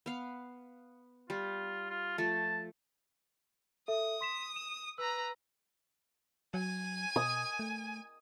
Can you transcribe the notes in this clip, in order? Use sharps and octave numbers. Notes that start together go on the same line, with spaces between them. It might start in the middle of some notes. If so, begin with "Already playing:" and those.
B3 F5
G3 F4
F4
F3 A3 A5
A4 E5 D#6
C6 B6 E7
E7
B4 A#5 E6
F#3 G#5
B2 D#6
A3